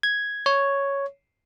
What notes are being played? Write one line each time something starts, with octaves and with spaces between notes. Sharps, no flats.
G#6
C#5